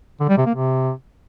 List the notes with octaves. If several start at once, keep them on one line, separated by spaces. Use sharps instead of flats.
D3
G3
C3
A#3
C3